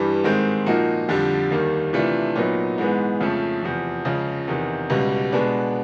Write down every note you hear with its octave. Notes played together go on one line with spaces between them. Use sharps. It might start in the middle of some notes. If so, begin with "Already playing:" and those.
Already playing: G2 E3 G3
G#2 D#3 G#3 C4
A#2 F3 A#3 D#4 F#4
F2 D3 G3
D#2 D#3 G3 A#3
C3 E3 A3 D4 F4
A#2 F#3 B3 D#4
G#2 E3 G#3 B3
F2 C#3 F3 A3
E2 C3 F3
C#2 C#3 F3
E2 C3 D#3
C#2 B2 G3
B2 G#3 B3 D4